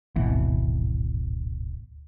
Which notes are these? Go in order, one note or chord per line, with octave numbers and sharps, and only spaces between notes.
D1 G#1 B2 E3